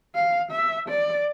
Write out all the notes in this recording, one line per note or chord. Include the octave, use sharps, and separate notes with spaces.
F5
E5
D5